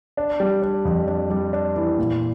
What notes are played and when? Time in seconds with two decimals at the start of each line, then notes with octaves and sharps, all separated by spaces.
0.17 D4
0.40 G3
0.62 D4
0.85 F2
1.08 D4
1.30 G3
1.53 D4
1.76 E3
1.98 A#2